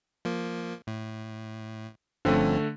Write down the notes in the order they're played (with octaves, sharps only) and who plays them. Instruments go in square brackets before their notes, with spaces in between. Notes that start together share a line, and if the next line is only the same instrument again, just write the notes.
[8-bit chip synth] F3 A#3
A2
[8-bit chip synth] G1 G2 C#4 [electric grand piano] D3 A3 [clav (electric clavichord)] F3 C4